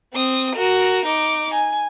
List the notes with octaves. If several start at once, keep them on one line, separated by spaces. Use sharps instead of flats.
C4 D#6
F#4 A#4
D#4 D6
G#5